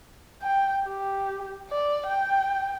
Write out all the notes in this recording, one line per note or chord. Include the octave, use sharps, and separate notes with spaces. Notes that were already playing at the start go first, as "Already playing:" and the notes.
G5
G4
D5
G5